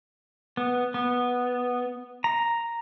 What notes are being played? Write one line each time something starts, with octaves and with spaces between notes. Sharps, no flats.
B3
B3
A#5